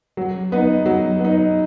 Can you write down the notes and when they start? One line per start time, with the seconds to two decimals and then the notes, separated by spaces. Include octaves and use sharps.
0.17 F#3
0.52 B3 D#4
0.86 F#3
1.20 B3 D#4